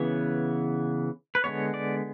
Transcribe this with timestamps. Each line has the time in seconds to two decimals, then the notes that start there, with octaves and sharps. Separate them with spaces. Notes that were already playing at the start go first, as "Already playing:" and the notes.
Already playing: C#3 E3 B3 C#5
1.35 B4
1.44 D3 G#3 B3 C#5
1.74 D5